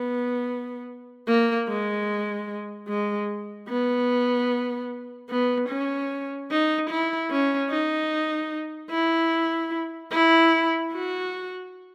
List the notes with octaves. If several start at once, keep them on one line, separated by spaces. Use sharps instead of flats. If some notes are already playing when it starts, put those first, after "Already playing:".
Already playing: B3
A#3
G#3
G#3
B3
B3
C#4
D#4
E4
C#4
D#4
E4
E4
F#4